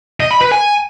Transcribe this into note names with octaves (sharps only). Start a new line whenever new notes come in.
D#5
B5
B4
G#5